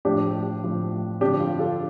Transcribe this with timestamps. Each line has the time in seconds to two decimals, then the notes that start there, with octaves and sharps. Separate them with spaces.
0.05 A2 F3 D4 G4
0.64 A2 F3
1.20 G2 D3 F3 D4 G4
1.40 F4
1.59 F4 A4